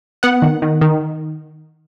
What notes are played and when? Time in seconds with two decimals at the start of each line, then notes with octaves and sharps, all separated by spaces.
0.23 B3 F#5
0.42 D#3
0.62 D#3
0.81 D#3